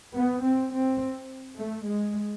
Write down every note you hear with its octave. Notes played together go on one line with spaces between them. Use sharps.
B3
C4
C4
A3
G#3